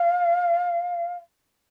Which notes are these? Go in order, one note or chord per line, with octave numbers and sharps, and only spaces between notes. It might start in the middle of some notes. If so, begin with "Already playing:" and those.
Already playing: F5